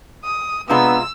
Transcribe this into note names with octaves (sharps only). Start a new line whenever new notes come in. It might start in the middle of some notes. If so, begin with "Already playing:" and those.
D#6
C3 G#3 B3 D4 F4 A#5 B5 E6